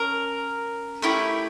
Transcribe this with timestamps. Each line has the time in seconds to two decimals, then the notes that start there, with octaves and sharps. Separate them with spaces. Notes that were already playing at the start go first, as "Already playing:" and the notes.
Already playing: C#4 A#4
1.02 A3 C#4 E4 G4